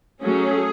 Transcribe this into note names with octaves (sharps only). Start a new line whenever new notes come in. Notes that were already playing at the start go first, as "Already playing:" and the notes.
F#3 A3 C#4 G#4